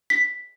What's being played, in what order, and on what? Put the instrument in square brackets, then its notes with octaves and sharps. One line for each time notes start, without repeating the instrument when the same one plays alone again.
[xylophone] B6